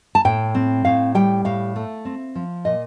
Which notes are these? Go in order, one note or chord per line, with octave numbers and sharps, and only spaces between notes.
A5
A2 G5
C4
A2 F5
G3 G5
A2 F5
A3
C4
F3
A#2 D#5